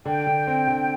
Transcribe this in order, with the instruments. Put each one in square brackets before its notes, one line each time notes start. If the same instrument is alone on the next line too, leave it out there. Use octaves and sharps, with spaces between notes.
[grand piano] D3 [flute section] G5
[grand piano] D3
C4
D3